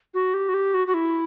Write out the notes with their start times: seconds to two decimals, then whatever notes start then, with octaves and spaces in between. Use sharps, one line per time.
0.14 F#4
0.34 G4
0.49 F#4
0.54 G4
0.74 F#4
0.87 F#4
0.94 E4